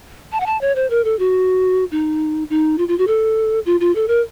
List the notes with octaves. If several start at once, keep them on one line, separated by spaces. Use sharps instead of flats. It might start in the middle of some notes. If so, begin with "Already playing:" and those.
A5
F#5
A5
C#5
C5
A#4
A4
F#4
D#4
D#4
F4
F4
F#4
A4
F4
F4
A4
A#4